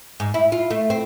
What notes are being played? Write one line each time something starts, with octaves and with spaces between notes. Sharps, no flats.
G#2
E4
F4
A3
C4